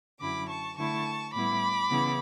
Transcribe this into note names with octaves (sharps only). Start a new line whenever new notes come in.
F#2 D3 F#3 C#4 E4 B5 D6
A5 C#6
D3 A3 E4 A5 C#6
A2 G3 B3 E4 B5 D6
C#3 E3 B3 E4